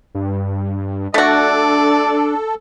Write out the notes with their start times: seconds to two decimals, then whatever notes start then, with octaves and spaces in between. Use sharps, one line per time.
0.15 G2
1.14 A3 D4 F#4 A4 D5